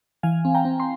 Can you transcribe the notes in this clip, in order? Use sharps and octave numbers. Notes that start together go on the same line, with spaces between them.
E3 F5 G#5
C4
G5 A#5
C4
C6